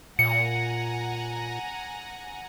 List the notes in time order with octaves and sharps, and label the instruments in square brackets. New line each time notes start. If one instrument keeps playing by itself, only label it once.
[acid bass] A#2 [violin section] F#5 G#5 A#5 [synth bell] C#7